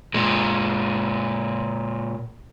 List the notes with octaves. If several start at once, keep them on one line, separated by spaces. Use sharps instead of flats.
A#2 G#3